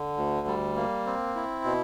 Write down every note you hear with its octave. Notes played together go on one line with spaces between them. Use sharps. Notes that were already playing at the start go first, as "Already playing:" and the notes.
Already playing: D3
D2
G3
A#3
C4
E4
B2